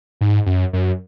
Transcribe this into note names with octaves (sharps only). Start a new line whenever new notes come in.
G#2
F#2
F#2